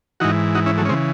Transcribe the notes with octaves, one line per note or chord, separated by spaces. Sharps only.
G#2 E3 D#4 F#4
D#4 F#4
C#4 E4
F#3 A3
C#4
C#3 E3 G#3 C4